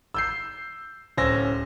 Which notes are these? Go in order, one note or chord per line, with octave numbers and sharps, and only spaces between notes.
E6 G6 C7
D1 C#4 C5 E6 A#6